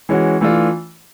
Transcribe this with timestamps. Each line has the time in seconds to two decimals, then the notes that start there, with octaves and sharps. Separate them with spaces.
0.09 E3 G#3 C#4 F#4
0.41 E3 A3 D4 F4